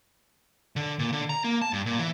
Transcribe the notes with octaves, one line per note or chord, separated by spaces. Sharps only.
D3
A#2
D3
A#5
A#3
A5
G2
A#2
E3